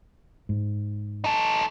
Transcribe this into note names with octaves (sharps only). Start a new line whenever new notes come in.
G#2
D#4 A4